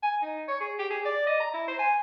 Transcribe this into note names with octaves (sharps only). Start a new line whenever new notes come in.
G#5
D#4
C#5
G#4
G4
G#4
D5
D#5
A#5
E4
C5
G#5